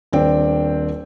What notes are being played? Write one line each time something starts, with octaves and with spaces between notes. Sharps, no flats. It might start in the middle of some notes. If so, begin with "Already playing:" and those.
D#1 C4 D4 G5